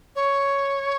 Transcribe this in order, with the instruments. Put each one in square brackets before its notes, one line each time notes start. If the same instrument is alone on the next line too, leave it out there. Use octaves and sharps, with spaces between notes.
[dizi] C#5